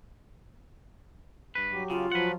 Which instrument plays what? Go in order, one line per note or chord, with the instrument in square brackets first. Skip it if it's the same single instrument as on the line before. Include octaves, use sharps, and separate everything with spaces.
[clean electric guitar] G2 B4
[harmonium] F#3 G4
[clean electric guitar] C#3 [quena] F4
[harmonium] F3 F#3 [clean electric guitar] B4 F#5